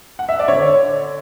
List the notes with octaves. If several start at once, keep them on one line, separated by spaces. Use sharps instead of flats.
F#5
E5
D5
D3 C#5